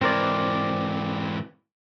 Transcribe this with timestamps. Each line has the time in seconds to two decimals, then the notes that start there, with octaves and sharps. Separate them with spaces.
0.02 G#2 E3 C4 A#4 D5